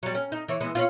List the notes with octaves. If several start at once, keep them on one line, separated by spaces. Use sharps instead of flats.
F#3 G3
C#4
D#4
E3 C#5
E3 G#3 B3
C#4 D4 F4